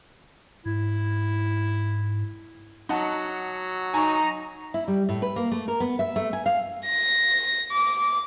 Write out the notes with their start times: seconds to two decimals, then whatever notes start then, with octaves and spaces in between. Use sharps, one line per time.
0.66 G#2 E4
2.89 F#3 D#4 F#5 A5
3.94 D#4 G#5 A#5 C#6
4.74 E4
4.88 G3
5.09 A2
5.22 B4
5.36 A#3
5.52 A3
5.68 A#4
5.80 B3
5.99 E5
6.16 A3
6.33 G#5
6.46 F5
6.85 A#6
7.72 D6